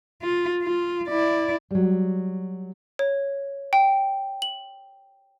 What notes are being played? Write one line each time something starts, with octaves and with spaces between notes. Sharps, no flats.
F4
F4
E4 D5
F#3 G3
C#5
G5
F#7